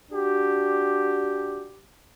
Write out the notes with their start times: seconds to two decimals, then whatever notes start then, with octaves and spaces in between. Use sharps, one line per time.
0.12 D4 F#4 G4